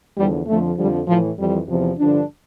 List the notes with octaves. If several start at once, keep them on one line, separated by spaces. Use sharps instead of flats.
E2 D3 F3 G3
F2 D3 F3 A3
F2 D3 F3 G3
A2 E3 F3
F2 E3 G3
E2 C3 F3
G2 D3 F3 D4